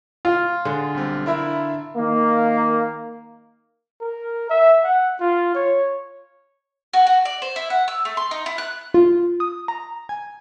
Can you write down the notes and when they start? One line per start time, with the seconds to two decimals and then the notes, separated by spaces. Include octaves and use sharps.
0.25 F4
0.65 D3 G#4
0.95 B1 G3 C4
1.26 D4 E4 A#4 E5
1.98 D#3 A#3
4.01 A#4
4.50 E5
4.84 F#5
5.21 F4
5.55 C#5
6.93 F#4
7.07 F#4
7.25 D5
7.42 C5
7.56 E4
7.70 F#5
7.88 E6
8.05 A3
8.17 C6
8.31 D#4
8.46 E4
8.58 F#6
8.94 F4
9.40 D#6
9.68 A#5
10.09 G#5